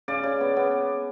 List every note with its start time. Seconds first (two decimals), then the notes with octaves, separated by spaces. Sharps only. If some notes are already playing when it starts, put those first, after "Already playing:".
0.08 C#3 D5
0.24 C#3
0.41 B3
0.57 B3